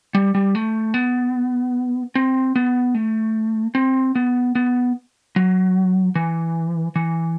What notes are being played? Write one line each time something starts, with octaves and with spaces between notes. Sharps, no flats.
G3
G3
A3
B3
C4
B3
A3
C4
B3
B3
F#3
E3
E3